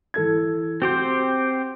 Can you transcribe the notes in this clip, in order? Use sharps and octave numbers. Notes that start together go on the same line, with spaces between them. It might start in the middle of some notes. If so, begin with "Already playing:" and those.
E3 A4 G#6
C4 F#4 G4 C5